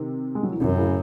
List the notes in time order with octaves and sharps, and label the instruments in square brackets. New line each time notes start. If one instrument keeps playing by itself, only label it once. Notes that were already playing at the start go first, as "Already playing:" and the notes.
Already playing: [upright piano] C3 D#3
G#3
F#3
E3
[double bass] F#2 [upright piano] C3 D#3
[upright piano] A2 C#3